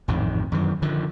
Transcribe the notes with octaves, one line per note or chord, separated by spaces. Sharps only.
A1 F2 G#2 D#3
F#2 D#3 E3
D3 D#3 F3